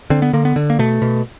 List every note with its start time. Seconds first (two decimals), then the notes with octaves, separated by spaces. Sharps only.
0.10 D3 C4
0.22 B3
0.33 D3 A#3
0.45 B3
0.56 D3
0.70 A#3
0.79 B2 A3
1.02 B2